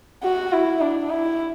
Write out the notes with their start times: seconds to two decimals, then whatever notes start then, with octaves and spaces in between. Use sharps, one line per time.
0.24 F#4
0.53 E4
0.81 D4
1.10 E4